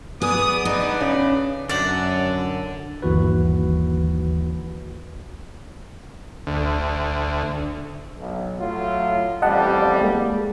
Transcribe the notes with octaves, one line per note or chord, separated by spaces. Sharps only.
B3 G#4 D5 D#6
D4 D#4 B4 D5
C#3
F#2 D3 D5 F#5
G1 D#2 E3 F#4 B4
D2
B1
A2 F#3 F4
A1 F2 G3 D#5 F#5 A5
G#3 A#3